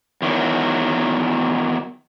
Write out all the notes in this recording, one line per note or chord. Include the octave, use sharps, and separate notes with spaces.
E2 D#3 F#3